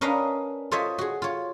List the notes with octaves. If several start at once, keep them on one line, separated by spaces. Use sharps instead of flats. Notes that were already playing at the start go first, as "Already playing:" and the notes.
C#4 D4 A#4 B4 D#5 F5
F4 A4 C5 C#5 D#5 E5
F#4 G#4
F4 C#5